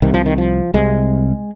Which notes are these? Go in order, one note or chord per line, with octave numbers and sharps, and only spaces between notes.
C2 C3 D#3
F3
D#3
F3
C2 C3 G#3